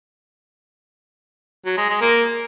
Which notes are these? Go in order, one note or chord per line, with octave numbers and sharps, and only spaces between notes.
F#3
G#3
G#3
A#3